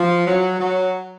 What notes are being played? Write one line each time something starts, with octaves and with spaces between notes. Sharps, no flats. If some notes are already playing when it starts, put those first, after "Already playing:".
Already playing: F3
F#3
F#3